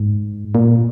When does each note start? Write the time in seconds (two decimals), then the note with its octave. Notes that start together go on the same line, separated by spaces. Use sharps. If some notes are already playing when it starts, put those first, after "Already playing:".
Already playing: G#2
0.55 A#2